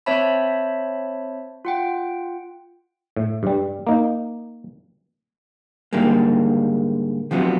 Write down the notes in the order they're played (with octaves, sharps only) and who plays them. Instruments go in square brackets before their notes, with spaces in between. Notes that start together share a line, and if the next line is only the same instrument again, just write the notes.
[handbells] C4 C5 C#5 E5 A5 B5
F4 F#5 G5
[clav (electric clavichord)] A2
G2 G3
A#3 D#4
[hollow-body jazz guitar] G#2 D3 G3 G#3 A#3
C3 F3 F#3 B3 C4